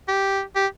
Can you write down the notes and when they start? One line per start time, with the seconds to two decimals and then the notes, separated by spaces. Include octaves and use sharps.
0.08 G4
0.56 G4